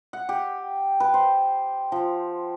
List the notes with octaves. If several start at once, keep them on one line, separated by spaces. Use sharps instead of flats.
F#5
G4
B4
C5
F3